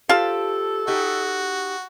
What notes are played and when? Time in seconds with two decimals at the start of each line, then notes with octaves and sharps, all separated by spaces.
0.09 F4 G4 A4 C5 A5
0.88 D#4 F#4 G4